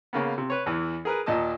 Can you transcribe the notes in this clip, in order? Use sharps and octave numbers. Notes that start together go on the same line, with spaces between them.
C#3 A#3 B3
C3
B4 C#5
E2 E3
G#4 A#4 B4
D#2 A#2 D#5 A5 D#6